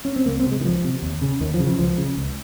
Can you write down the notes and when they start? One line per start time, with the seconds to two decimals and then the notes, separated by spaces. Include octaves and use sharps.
0.05 C#4
0.16 C4
0.26 C#2 A#3
0.40 C4
0.46 C3
0.51 G#3
0.61 D#3
0.64 C#2 F3
0.84 C3
1.02 D#2
1.22 C#3
1.40 D#2 D#3
1.54 F3
1.60 C#3
1.66 F3
1.78 C#2 F3
1.98 C#3
2.17 C#2